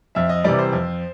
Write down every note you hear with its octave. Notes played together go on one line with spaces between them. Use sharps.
F2 E5
D#5
C3 E3 G3 D5
C5
F2